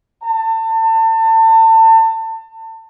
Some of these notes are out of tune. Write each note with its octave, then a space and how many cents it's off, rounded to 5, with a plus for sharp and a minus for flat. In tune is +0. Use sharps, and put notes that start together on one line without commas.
A5 +30